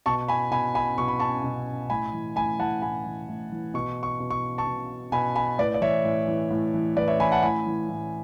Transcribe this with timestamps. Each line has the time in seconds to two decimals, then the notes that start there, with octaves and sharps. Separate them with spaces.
0.06 B2 A5 C#6
0.28 G#5 B5
0.51 B2 G#5 B5
0.75 G#5 B5
0.98 B2 C#6
1.08 B5
1.19 A5 C#6
1.44 B2
1.90 A2 G#5 B5
2.13 E3
2.36 A2 G#5 B5
2.59 E3 F#5 A5
2.82 A2 G#5 B5
3.05 E3
3.29 A2
3.52 E3
3.74 B2 C#6
4.03 C#6
4.20 B2
4.31 C#6
4.58 A5 C#6
4.67 B2
5.12 B2 G#5 B5
5.36 G#5 B5
5.58 A2 B4 D5
5.74 D5
5.81 E3 C#5 E5
6.05 A2
6.28 E3
6.51 A2
6.74 E3
6.96 A2 B4 D5
7.08 C#5 E5
7.19 E3 G#5 B5
7.31 F#5 A5
7.43 A2 G#5 B5
7.66 E3
7.89 A2